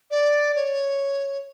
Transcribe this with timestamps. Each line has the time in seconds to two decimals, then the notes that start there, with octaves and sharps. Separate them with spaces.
0.11 D5
0.55 C#5